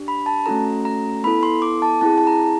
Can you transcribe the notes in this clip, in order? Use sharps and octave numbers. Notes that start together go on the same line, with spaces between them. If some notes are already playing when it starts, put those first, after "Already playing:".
Already playing: D4 G4
B5
A5
A3 C#4 F#4 A4 A#5
A#5
B3 E4 A4 B5
C6
D6
A5
C4 E4 G#4 A5
A5
A#5